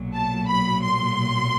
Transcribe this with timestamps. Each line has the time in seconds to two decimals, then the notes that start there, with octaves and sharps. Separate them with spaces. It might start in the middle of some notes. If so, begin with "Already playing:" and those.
Already playing: B1 A#2 F#3
0.14 A5
0.49 B5
0.83 C6